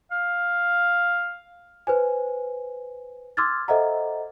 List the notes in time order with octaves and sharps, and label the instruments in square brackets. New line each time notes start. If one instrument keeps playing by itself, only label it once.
[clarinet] F5
[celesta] B4 C5 G#5
C6 D6 E6 F6 G#6 A6
A4 C5 D#5 E5 F#5 A#5